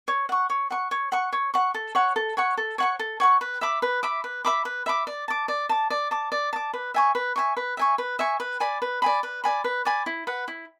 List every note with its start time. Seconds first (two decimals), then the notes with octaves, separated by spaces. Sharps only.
0.08 C#5
0.29 F#5 C#6
0.50 C#5
0.70 F#5 C#6
0.91 C#5
1.12 F#5 C#6
1.33 C#5
1.54 F#5 C#6
1.74 A4
1.95 C#5 F#5 C#6
2.16 A4
2.37 C#5 F#5 C#6
2.57 A4
2.78 C#5 F#5 C#6
2.99 A4
3.20 C#5 F#5 C#6
3.41 B4
3.61 E5 B5 D6
3.82 B4
4.03 E5 B5 D6
4.24 B4
4.45 E5 B5 D6
4.65 B4
4.86 E5 B5 D6
5.07 D5
5.28 A5 D6
5.48 D5
5.69 A5 D6
5.90 D5
6.11 A5 D6
6.32 D5
6.53 A5 D6
6.73 B4
6.94 E5 G#5 C#6
7.15 B4
7.36 E5 G#5 C#6
7.57 B4
7.77 E5 G#5 C#6
7.98 B4
8.19 E5 G#5 C#6
8.40 B4
8.60 D5 G#5 B5
8.82 B4
9.02 D5 G#5 B5
9.23 B4
9.44 D5 G#5 B5
9.64 B4
9.85 D5 G#5 B5
10.06 E4
10.27 B4 F#5
10.48 E4